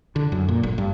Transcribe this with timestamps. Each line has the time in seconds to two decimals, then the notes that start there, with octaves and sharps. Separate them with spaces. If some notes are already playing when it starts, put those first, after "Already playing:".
0.16 D3
0.32 F#2
0.49 A#2
0.63 G1
0.78 G2